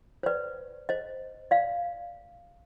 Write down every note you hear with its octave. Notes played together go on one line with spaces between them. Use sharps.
C5
B4 D5
C5 D#5
D5 F5